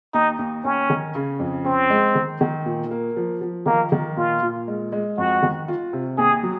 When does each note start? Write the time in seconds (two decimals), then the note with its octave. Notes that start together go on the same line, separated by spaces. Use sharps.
0.14 D#2 D#4
0.39 D#2
0.64 D#2 C#4
0.90 D#3
1.15 C#3
1.40 F2
1.65 C4 C#4
1.90 G#3
2.15 D#3
2.41 D#3
2.65 A#2
2.91 A#3
3.16 F3
3.41 F3
3.66 D#3 A#3
3.92 D#3
4.17 A#2 F4
4.42 A#2
4.68 G#3
4.92 G#3
5.17 F2 F#4
5.42 D#3
5.68 F4
5.93 C3
6.18 D#2 G#4
6.43 F#3